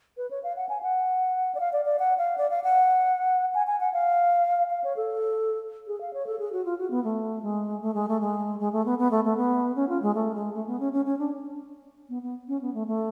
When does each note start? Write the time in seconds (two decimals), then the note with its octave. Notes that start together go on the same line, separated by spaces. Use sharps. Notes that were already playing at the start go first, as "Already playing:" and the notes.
0.17 B4
0.31 C#5
0.43 F5
0.56 F#5
0.69 G#5
0.83 F#5
1.55 D5
1.60 F5
1.73 D5
1.85 D5
1.99 F#5
2.18 F5
2.38 D5
2.50 F5
2.64 F#5
3.54 G#5
3.67 G#5
3.80 F#5
3.93 F5
4.70 F5
4.84 C#5
4.97 A4
5.87 G#4
6.01 F5
6.13 C#5
6.26 A4
6.39 G#4
6.52 F#4
6.65 F4
6.78 F#4
6.91 B3
7.04 A3
7.43 G#3
7.82 A3
7.94 G#3
8.08 A3
8.21 G#3
8.60 G#3
8.72 A3
8.85 B3
8.99 B3
9.11 A3
9.24 A3
9.37 B3
9.76 C#4
9.89 F4
10.02 G#3
10.15 A3
10.35 G#3
10.54 A3
10.67 B3
10.80 C#4
10.93 C#4
11.06 C#4
11.19 D4
12.09 B3
12.22 B3
12.48 C#4
12.61 B3
12.74 A3
12.87 A3